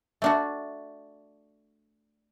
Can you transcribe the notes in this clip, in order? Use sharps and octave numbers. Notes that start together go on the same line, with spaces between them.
A3 D4 F#4